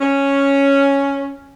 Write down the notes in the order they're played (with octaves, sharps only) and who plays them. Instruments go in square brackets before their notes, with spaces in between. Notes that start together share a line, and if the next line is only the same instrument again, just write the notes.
[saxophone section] C#4